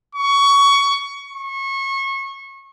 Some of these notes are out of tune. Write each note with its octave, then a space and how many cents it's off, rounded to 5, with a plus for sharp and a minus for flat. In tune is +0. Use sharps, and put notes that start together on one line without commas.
C#6 +20
C#6 -30